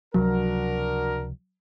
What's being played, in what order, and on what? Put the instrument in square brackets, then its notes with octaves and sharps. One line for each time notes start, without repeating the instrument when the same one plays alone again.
[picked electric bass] C#2 C3 F3 [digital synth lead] F#3 [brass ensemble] D4 F#4 A#4